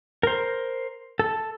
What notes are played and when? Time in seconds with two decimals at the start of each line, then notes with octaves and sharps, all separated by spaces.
0.23 A#4 C5
1.19 A4